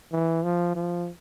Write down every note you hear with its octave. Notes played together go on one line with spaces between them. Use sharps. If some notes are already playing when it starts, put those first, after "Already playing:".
E3
F3
F3